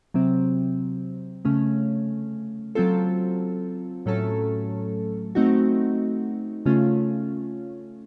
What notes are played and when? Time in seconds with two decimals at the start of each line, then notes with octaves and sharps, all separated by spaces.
0.14 C3 F#3 C4
1.45 C#3 A3 C#4
2.75 F#3 C4 F4 A4
4.06 A2 F#3 A3 C#4 A4
5.35 A3 C4 D#4 F#4
6.66 C#3 A3 C#4 F4